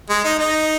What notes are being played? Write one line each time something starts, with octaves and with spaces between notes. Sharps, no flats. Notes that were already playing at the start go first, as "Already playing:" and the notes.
G#3
D#4
D#4